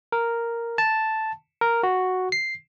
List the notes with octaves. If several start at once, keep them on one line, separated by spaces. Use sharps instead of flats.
A#4
A5
A#4
F#4
C7